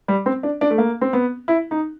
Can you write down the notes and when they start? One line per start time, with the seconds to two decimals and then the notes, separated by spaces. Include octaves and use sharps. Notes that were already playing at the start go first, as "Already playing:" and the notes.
0.08 G3
0.26 C4
0.43 D4
0.61 D4
0.70 A3
0.78 A#3
1.01 C4
1.13 B3
1.48 E4
1.71 D#4